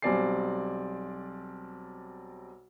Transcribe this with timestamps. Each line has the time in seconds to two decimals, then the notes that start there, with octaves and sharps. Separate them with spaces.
0.02 B1 G3 C4 D5 G#5 C7